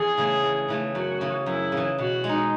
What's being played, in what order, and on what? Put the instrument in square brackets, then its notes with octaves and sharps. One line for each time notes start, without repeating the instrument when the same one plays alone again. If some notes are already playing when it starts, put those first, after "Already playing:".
Already playing: [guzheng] E2 [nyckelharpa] G#4
[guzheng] C#3 E3 A3
E2
C#3 E3 A3
[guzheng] F#2 [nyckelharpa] F#4
[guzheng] C#3 E3
[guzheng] F#2 [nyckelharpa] E4
[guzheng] C#3 E3
[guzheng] B2 [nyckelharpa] F#4
[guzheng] G#3
D#4